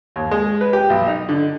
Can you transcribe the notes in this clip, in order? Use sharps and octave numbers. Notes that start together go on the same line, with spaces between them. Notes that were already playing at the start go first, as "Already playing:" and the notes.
D#2
G#3
B4
G4
B1
D#4
D3